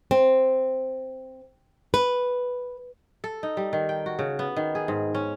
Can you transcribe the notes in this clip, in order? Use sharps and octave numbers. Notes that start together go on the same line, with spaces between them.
C4
B4
A4
D#4
G3
D#3
G5
F#4
C#3
B3
D#3
G#4
G#2
C#4